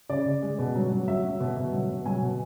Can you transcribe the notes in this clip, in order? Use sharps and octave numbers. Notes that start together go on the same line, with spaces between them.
C#3 D5
C#3
G#3
B2
F#3
F#3
F#3 E5
F#3
B2
B2
F#3
B2
F#3 G#5
B2